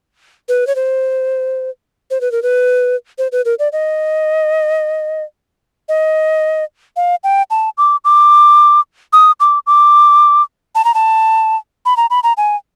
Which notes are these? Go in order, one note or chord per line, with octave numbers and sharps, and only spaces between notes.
B4
C#5
C5
C5
B4
A#4
B4
C5
B4
A#4
D5
D#5
D#5
F5
G5
A5
D6
D6
D#6
D6
D6
A5
A#5
A5
B5
A#5
B5
A#5
G#5